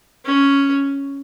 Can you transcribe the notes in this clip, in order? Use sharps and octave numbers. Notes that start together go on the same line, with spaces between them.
C#4